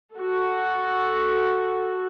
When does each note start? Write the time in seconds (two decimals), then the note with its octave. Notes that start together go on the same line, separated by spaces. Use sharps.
0.15 F#4 A4